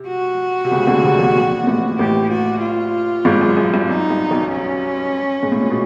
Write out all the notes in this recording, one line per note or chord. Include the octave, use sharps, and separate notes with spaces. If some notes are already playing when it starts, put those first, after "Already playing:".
Already playing: C3
F#4
C3
C#2 C#3
D2 D3
C2 C3
B1 B2
A#1 A#2
A#2
A1 A2
A1 A2 G4
F#4
F4
G#1 G#2
F#2
F#2
G2
F#2 D#4
G2
B1 B2
C#4
G#2
A2
A#2
B2